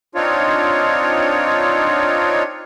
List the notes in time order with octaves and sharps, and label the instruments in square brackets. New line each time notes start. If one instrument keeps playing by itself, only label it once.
[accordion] C4 D4 D#4 F4 C#5